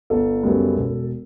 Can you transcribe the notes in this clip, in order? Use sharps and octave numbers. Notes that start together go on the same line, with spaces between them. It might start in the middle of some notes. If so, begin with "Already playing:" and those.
G1 A4
F#2 C#3 G3 B3
E1